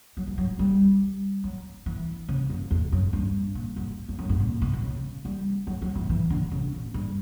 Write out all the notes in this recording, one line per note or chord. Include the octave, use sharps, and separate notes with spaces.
F#3
E3
F#3
G3
F#3
E3
C#3
F#2
E2
F#2
G2
A#2
F#2
F#2
F#2
G2
A#2
B2
B2
C#3
G3
F#3
F#3
E3
E3
D3
C#3
A#2
G2